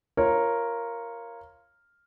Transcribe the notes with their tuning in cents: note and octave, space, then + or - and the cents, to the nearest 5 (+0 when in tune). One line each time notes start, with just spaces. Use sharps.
F4 -15 A#4 +0 C#5 -15